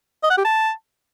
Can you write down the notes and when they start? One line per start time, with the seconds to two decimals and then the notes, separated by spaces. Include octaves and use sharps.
0.23 D#5
0.30 F#5
0.38 G4
0.45 A5